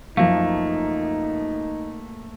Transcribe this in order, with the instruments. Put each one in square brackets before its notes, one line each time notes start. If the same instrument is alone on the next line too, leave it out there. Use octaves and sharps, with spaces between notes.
[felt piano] F#2 F3 [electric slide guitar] A3 A#3 [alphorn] D#4 [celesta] F5